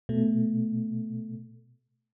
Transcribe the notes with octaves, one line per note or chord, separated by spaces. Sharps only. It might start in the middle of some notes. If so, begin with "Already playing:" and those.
B2 A3